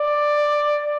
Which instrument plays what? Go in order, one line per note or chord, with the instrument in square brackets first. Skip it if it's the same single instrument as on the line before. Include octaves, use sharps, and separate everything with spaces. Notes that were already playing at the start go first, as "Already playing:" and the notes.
Already playing: [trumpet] D5